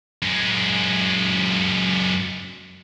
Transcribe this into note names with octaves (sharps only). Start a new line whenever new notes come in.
F#2 G#3